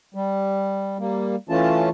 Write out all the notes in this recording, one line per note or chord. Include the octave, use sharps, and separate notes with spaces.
G3
G3 A#3
E3 A3 C#4 F4 A5